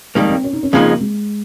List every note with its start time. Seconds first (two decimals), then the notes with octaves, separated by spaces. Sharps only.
0.15 F2 D#3 G3 G#3 A#3
0.30 C4
0.44 C#4
0.53 D#4
0.63 C#4
0.73 F2 C#3 F3 G#3 A#3 D#4
1.01 G#3